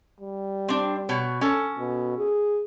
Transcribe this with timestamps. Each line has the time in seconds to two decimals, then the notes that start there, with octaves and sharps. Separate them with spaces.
0.20 G3
0.68 C4 D4
1.09 B2 C#5
1.41 C#4 A4
1.79 B2
2.18 G#4